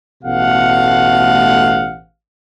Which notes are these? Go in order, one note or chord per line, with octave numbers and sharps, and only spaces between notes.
A1 B2 A3 F5 F#5